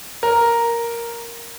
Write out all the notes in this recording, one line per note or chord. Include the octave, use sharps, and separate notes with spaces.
A#4